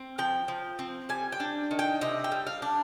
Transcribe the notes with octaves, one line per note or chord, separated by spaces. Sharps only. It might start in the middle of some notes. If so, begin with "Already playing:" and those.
Already playing: C4
F3 G5
F3
C4
G3 G#5
G5
D4
D#3
G5
C3 D#5
G5
G3
F5
D4